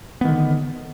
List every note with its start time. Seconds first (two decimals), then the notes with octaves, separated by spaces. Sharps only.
0.21 B3
0.25 D#3
0.29 D3